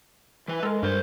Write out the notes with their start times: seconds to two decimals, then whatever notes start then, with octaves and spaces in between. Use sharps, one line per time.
0.48 E3 B4
0.63 G#3 A4 A#4
0.83 G2 A#4 C5